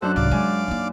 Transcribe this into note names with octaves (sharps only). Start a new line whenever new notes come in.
F#2 D4 A4 C5 F#5 F#6
C2 G#2 D5 F5 D6
F#2 G#3 G#5
A#3 D#4